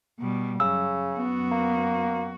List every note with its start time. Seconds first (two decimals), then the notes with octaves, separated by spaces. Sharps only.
0.20 B2 G3
0.60 F#2 C#3 E6
1.17 F#2 B3 F#4
1.52 A#3